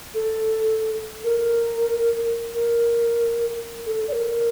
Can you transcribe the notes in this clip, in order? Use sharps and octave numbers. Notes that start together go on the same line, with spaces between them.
A4
A#4
A#4
A4
D5
A#4